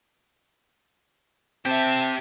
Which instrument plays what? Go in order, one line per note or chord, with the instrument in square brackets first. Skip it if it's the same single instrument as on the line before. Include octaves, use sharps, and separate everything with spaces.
[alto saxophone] C4 [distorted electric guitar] G4 C5 [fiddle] E5 A5